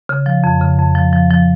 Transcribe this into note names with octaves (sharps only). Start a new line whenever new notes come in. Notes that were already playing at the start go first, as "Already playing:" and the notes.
C#3
F3
F2
C#3
F2
F3
F3
F3